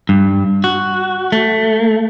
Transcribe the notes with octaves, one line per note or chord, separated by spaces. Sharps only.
G2
F#4
A3